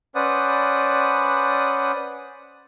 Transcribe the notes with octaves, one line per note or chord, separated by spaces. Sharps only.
C#4 B4 C5 D5 F#5 D#6